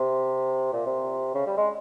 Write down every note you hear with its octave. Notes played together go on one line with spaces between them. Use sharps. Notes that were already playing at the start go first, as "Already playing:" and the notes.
Already playing: C3
A#2
C3
C#3
G3
G#3